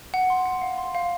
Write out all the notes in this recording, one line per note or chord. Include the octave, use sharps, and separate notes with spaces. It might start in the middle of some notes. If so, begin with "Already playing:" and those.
F#5
C6
F#5
F5
C6
F5